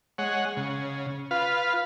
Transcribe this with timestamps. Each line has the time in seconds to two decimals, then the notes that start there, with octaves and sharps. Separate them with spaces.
0.18 G#3 C#5 F#5
0.57 C#3
1.31 F4 B4 F5